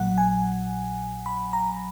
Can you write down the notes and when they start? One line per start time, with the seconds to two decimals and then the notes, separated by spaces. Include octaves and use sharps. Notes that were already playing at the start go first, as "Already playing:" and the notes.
Already playing: A#1 A#2 F#3 F#5
0.18 G#5
1.26 B5
1.53 A#5